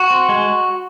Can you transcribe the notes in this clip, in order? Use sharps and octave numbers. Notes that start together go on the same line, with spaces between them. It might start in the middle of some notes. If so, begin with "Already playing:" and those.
Already playing: F#4
C4
G#3